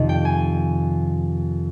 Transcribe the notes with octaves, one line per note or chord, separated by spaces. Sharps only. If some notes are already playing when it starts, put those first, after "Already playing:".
Already playing: F2 C3 D#3 D#5
G5
G#5